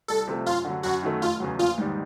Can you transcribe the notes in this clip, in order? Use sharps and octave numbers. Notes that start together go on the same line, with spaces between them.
C2 A4
C3 F3 A3
F#2 F4
D3
F#3
F#2 F#4
D#3 F#3 A3
F1 F4
E2 C#3 F#3
A#1 F4
G#2 D#3 G3